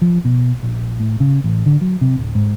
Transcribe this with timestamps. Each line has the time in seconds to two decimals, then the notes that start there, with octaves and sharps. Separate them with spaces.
0.02 F3
0.25 B2
0.63 A#1
1.00 A2
1.20 C#3
1.44 A1
1.66 D3
1.81 F#3
2.01 C3
2.16 D1
2.35 G#2